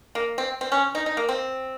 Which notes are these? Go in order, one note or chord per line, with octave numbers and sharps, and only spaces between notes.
A#3
C4
C4
C#4
D#4
D#4
A#3
C4